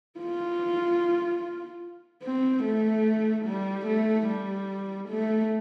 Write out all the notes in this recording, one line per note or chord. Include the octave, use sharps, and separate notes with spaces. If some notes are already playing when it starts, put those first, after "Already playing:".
F4
C4
A3
G3
A3
G3
A3